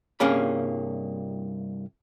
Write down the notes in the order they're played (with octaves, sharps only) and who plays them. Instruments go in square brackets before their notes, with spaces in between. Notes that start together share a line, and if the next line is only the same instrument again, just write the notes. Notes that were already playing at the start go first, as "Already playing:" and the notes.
[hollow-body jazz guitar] C2 G2 A#3 C#4 G#4 B5